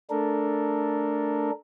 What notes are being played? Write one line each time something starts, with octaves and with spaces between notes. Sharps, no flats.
A3 D4 A4 A#4